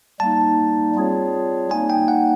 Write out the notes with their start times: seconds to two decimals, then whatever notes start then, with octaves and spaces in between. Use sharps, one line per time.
0.20 G3 A#3 D#4 A5
0.95 G3 C4 F4 G#4 C#5
1.70 G3 A#3 D#4 G#5
1.90 G5
2.08 F#5